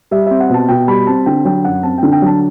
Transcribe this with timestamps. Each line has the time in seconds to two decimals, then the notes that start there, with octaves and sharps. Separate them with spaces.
0.11 G3 E5
0.26 C4 E5
0.40 F#5
0.49 B2 A5
0.68 B2 G5
0.88 G3 B5
1.07 C4 A5
1.26 D3 G5
1.45 F#3 G5
1.64 F#2 F#5
1.83 C4 A5
1.98 D3 G5
2.12 G5
2.22 F#3 A5